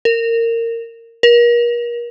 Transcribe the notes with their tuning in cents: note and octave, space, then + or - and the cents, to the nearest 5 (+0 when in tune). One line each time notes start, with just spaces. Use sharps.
A#4 -20
A#4 +35